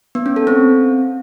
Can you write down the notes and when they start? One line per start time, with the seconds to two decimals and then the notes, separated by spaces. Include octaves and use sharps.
0.15 B3
0.26 C#4
0.36 A4
0.47 C4